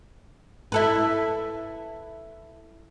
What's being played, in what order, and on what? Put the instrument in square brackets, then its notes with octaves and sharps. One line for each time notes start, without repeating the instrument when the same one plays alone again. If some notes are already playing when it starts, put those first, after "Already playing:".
[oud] E4 A4 B4